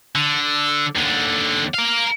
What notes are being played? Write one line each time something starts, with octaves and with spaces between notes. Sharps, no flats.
D3
D#2 D3
A#4 F5